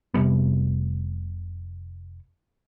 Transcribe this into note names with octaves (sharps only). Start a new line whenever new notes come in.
F1 C3 G3 B3